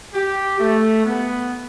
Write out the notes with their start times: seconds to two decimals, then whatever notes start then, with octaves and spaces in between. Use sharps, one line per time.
0.13 G4
0.60 A3
1.05 B3